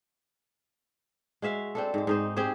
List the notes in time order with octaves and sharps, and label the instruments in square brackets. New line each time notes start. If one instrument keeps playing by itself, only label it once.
[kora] G#3 F#4 E5 F5
C4 D4 A4
G#2 G#3
G#2 D#4 C5
C4 G4 G#4 C5